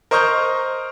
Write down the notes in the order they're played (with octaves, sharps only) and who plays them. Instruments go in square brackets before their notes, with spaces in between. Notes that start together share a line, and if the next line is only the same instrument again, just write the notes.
[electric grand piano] A#4 C5 D#5 C#6 F6 G6